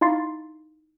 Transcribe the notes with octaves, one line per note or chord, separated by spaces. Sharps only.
D#4 E4 F5 C6 A6 C7